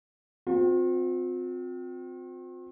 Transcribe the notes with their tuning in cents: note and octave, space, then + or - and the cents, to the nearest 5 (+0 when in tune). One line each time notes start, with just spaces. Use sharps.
C4 -15 F4 +45